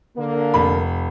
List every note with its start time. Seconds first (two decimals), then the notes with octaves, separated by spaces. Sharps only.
0.17 D3 A#3
0.54 F1 B5